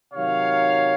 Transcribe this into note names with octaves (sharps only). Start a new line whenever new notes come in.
C3 D#3 F#3 C#5 F5